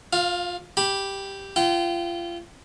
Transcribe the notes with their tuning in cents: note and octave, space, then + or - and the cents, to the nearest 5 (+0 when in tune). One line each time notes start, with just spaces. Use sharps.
F4 +20 F5 -15
G4 +0 B5 +0
F4 -30 G5 -30